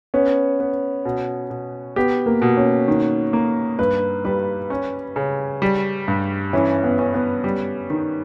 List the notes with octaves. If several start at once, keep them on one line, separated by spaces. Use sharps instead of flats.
B3 C#4
B3
B2
B2
B3 G4
A#3
B2
C#4
D#3
A#3
G2 B4
G3 B4
C#4
C#3
G3
G2
E3 C#4
B3
C#4
B3
G3
D#3